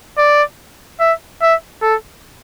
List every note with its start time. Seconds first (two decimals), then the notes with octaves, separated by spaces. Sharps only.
0.18 D5
1.00 E5
1.42 E5
1.82 A4